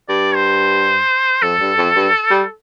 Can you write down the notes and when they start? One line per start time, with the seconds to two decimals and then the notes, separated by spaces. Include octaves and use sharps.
0.09 G2 D5
0.35 C5
1.42 F2 A4
1.60 G2
1.78 F2
1.96 G2
2.30 G3